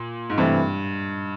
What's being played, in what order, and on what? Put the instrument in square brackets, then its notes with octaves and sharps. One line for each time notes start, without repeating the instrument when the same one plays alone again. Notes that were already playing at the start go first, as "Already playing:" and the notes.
Already playing: [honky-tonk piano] A#2
G#2
[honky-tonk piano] G2 [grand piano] C3 E3 A3 C4 E4